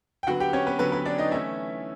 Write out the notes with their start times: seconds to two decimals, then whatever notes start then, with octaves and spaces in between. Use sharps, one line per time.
0.23 G5
0.27 D3 F#3 B3 F#4 F#5
0.40 G4 G5
0.53 C#4 C#5
0.67 B3 B4
0.79 D3 F#3 B3 B4
0.92 B3 B4
1.06 D4 D5
1.18 D#4 D#5
1.31 E3 A3 C#4 E4 E5